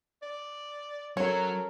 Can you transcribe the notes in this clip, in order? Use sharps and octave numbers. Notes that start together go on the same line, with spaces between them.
D5
F#3 C#4 A4 A#4 C#5